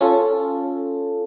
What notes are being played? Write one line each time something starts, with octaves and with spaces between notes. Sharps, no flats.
C#4 F4 A4